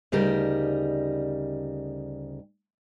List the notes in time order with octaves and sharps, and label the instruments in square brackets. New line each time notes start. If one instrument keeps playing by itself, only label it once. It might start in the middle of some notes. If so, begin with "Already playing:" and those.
[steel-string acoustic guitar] D2 C#3 G3 D#4 A#4